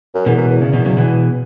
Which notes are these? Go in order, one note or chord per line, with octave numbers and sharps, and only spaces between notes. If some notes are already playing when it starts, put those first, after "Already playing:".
F#2
E2 B2 E3
F#2
E2
C#3
B2 E3
C#3 F#3
B2 E3